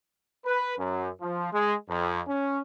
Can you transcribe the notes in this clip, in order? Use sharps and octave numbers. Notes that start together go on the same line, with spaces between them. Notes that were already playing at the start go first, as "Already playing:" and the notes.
B4
F#2
F3
G#3
F2
C#4